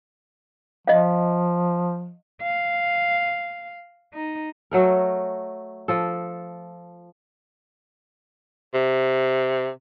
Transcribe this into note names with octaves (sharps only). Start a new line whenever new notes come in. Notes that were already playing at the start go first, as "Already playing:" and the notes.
F3 D#5 F5
F5
D#4
F#3 A3 A#4
F3 A4
C3